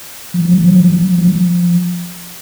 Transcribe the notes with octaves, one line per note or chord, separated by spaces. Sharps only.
F3
F#3
F3
F#3
F3
F#3
F3
F#3
F3